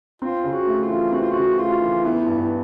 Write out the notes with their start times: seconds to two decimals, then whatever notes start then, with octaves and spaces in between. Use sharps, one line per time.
0.22 C4 F4
0.44 C#3
0.52 F#4
0.67 A3
0.83 F4
0.90 E3
1.12 C4 F#4
1.22 F4
1.31 F#4
1.36 C#3
1.59 A3 F4
1.82 E3
2.04 B3 E4
2.26 G2
2.41 E4